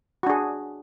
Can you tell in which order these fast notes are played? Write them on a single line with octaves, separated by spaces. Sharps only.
F#4 D4 G#4